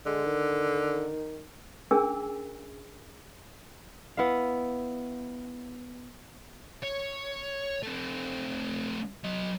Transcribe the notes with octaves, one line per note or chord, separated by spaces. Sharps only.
D3 G#3
D#3
C#4 D4 G#4 A#4 G#5 E6
B3 E4 E5 F5
C#5
A3 C4
F#3 D#5